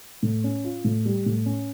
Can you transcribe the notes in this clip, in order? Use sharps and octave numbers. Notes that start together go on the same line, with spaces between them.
A2
C#4
F4
A2
G3
A2
C#4